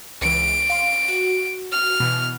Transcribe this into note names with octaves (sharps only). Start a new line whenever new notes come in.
C#2 E3 D7
F5 C6
F#4
F6
B2 E3